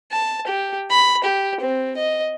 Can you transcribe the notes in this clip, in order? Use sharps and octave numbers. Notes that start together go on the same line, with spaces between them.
A5
G4
B5
G4
C4
D#5